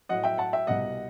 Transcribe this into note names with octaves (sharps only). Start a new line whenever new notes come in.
A2 F#3 D#5 F#5
E5 G5
F#5 A5
E5 G5
C2 B2 G3 D#5 F#5